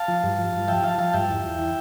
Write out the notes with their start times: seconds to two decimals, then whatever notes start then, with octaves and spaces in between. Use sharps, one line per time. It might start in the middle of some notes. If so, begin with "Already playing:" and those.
Already playing: F5 A5
0.08 F3
0.23 G2
0.39 F3
0.53 G2
0.68 F3 E5 G5
0.83 F3 F5 A5
0.98 F3 F5 A5
1.13 G2 E5 G5
1.29 E2
1.44 E2
1.59 E3